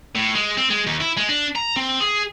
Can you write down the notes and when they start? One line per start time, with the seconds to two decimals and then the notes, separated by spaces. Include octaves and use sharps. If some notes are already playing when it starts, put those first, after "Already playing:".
0.16 A2
0.35 G#3
0.57 C4
0.70 G#3
0.87 D#2
1.00 E4
1.17 G#3
1.29 D4
1.56 A#5
1.76 C4
2.00 G#4